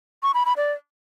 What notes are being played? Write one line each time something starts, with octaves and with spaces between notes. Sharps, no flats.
C#6
B5
B5
D5